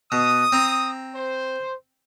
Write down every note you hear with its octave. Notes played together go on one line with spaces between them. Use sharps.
B2 D#6
C4 A#5
C5